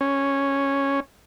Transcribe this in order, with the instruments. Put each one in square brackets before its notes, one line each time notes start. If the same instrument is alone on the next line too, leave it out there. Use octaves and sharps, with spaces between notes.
[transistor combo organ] C#4